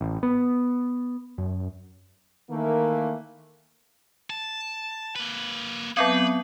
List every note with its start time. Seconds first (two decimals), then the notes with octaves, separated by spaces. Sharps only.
0.01 A1
0.23 B3
1.38 F#2
2.51 D#3 E3 A3 A#3
4.30 A5
5.16 A#3 B4
5.97 F#3 B3 C4 B4